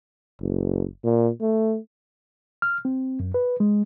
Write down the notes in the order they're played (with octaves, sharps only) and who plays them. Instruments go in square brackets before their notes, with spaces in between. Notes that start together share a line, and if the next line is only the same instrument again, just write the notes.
[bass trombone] F#1
A#2
A3
[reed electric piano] F6
C4
F#2
B4
G#3